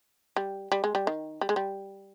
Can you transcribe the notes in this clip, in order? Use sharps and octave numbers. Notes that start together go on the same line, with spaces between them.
G3
G3
G#3
G3
D#3
G3
G#3
G3